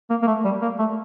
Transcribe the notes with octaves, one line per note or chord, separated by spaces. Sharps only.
A#3
A#3
A3
G3
A#3
A3